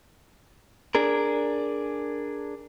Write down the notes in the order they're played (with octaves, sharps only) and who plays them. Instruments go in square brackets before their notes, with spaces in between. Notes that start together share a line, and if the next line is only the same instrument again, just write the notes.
[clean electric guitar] D4 G#4 A#4